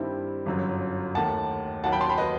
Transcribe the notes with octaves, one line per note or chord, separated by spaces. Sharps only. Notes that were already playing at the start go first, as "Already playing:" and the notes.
Already playing: G2 D#3 G3 C4 E4
G1 F#2 F#3
D#2 D#3 A3 F#5 A5
D#2 D#3 F#3 F#5 A5
G5 B5
A5 C6
G5 B5
B4 D#5